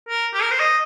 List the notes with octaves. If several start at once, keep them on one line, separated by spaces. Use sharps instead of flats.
A#4
G4
A#4
C5
D#5